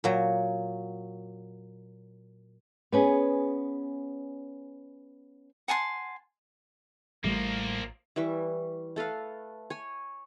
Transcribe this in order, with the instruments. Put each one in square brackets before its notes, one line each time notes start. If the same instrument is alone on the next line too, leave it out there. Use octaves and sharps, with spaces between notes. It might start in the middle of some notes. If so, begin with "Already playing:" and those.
[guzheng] A#2 F#3
[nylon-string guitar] B3 C#4 G#4
[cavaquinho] F#5 G#5 A5 C6
[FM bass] A1 [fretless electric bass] A2 G3 A3 [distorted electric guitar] F3 A#3
[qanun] E3 G3 E5 C#6
A3 A4 B4 F5
C#5 G#5